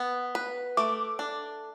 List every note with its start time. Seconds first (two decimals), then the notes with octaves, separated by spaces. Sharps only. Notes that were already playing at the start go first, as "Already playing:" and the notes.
Already playing: B3
0.35 B4
0.77 A3 D6
1.19 D4